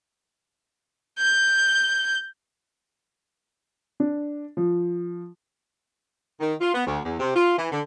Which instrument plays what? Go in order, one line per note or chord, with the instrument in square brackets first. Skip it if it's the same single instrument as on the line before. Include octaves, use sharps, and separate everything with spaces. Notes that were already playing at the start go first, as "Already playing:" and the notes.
[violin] G6
[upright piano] D4
F3
[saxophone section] D#3
F4
B3
D2
E2
C3
F4
E3
D3